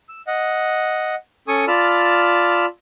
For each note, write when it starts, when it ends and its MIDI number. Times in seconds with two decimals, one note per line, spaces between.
0.09 0.21 88
0.27 1.15 75
0.27 1.15 78
1.48 1.65 61
1.48 1.65 69
1.48 1.65 80
1.48 1.65 85
1.48 1.65 87
1.68 2.66 65
1.68 2.66 74
1.68 2.66 81
1.68 2.66 83
1.68 2.66 88
1.68 2.66 89